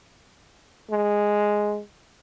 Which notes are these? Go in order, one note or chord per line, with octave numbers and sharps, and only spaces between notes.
G#3